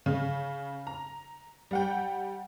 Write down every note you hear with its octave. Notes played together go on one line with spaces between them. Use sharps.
C#3
A#5
G3 F#5 G5